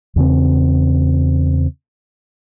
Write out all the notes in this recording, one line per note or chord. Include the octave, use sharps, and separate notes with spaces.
E2 C#3 C4